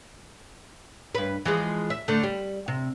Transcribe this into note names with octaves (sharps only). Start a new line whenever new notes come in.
G2 B4
E3 F3 G#3
E5
D3 A3
G3
C3